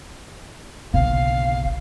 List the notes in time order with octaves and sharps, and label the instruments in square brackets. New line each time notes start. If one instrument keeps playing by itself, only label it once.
[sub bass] F#1 [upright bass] B1 D3 [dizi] F5